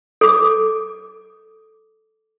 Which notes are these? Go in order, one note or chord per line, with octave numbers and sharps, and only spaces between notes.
A4 D6